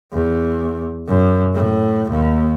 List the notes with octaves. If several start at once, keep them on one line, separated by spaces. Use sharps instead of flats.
E2
F#2
A2
D#2